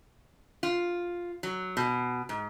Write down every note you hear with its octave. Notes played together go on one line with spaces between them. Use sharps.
F4
F#3
B2
G#2